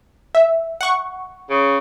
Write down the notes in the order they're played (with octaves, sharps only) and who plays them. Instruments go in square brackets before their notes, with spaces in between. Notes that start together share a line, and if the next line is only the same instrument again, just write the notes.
[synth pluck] E5
F#5 C#6
[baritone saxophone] C#3